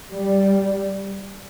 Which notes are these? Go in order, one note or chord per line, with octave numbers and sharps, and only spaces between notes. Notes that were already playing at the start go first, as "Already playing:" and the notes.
G3